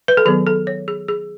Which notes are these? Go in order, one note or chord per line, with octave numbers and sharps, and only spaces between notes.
B4
A4
D#3 F#3 B3 G#4
A4
C#5
G#4
G#4